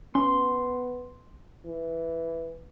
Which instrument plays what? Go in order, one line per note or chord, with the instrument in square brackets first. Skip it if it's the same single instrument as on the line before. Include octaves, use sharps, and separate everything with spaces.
[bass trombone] B3 [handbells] C#4 [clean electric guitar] C6
[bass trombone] E3